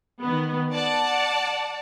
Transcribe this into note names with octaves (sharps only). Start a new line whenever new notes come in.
D#3 B3
D5 F#5 A5